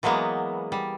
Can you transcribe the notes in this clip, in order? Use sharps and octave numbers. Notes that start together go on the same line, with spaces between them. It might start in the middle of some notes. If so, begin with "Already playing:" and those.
E3 F#3 G#3 A#3 B3
G3